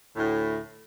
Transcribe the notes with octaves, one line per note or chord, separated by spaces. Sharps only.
D2 A2